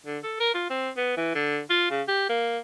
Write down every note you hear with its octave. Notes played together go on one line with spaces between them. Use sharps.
D3
A4
A#4
F4
C4
B3
E3
D3
F4
C#3
G4
A#3